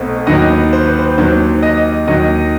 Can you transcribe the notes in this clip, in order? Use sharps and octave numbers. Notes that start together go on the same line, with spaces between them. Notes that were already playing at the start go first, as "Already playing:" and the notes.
Already playing: B1 B2 A3 C4
D#2 D#3 F#3 B3 D#5
C5
B4
C5
D#2 D#3 F#3 C5
D#5
D#2 D#3 F#3 D#5